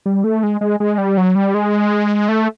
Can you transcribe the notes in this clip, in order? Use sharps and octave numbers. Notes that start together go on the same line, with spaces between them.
G3
A3
G#3
G#3
G#3
G3
F#3
G3
G#3
A3